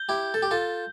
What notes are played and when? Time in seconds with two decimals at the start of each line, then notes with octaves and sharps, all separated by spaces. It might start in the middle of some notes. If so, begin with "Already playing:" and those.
Already playing: G6 G7
0.09 E4 G4
0.34 A4
0.42 G4
0.51 F4 A4